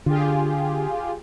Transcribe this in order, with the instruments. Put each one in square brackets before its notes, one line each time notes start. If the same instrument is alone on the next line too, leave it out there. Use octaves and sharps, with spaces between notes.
[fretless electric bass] D3 [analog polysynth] F4 G4 G#4